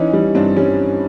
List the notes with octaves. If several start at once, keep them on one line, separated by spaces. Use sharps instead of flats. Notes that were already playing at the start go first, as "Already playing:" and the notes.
Already playing: E3 C#4 D#4
G3
G2 C4 D4
G3 C#4